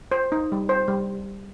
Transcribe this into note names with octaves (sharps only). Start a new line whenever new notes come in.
C5
D#4
G3
C5
G3